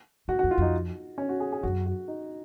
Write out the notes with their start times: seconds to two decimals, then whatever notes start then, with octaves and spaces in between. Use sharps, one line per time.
0.28 G#2 F#4
0.39 F2 F#4
0.51 F4
0.58 F2 D#4
1.18 C#4
1.29 F#4
1.40 G#4
1.52 G#4
1.63 F#2 F#4
1.86 F#4
2.08 D#4